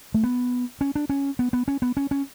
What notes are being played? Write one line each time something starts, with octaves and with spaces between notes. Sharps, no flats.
A3
B3
C#4
D4
C#4
B3
B3
C#4
B3
C#4
C#4